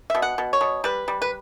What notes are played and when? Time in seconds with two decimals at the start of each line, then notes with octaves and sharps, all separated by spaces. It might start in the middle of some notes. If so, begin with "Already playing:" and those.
0.10 B2 E5
0.22 F#5
0.38 B2
0.53 C#5
0.61 B2
0.84 G3 B4
1.08 G3
1.22 B4